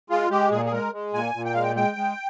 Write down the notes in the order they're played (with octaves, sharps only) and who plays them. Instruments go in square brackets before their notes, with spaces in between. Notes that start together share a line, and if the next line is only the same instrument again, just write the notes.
[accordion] G#3 F4
G#3 G4
A#2 G#4
G#4
G#3 A#4
G#3
A#2 G#5
A#2
G5
G#3 F5
G5
G#3 G5
G#3